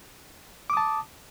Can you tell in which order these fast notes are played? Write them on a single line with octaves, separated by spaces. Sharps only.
D6 D#6 A5